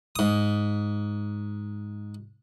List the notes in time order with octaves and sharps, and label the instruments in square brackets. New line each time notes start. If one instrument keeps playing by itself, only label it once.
[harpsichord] G#2 D#6